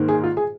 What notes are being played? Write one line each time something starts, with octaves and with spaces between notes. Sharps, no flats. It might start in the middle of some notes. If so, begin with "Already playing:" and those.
Already playing: G#2 D#3 A#3
G#4
F4
G#4